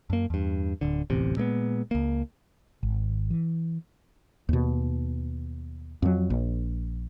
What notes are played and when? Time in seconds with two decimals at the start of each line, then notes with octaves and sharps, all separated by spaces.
0.10 F#2 A#3
0.30 E2 G2
0.81 D1 D3
1.10 D1 A1 E2 C3
1.37 A#2 G#3 A#3 B3
1.91 C#2 A#3
2.83 G#1
3.30 E3
4.49 D#2 B2
6.02 F2 F#3
6.30 A#1